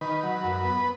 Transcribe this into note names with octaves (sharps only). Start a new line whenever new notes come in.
D#3 B4
F#3
F#2
B3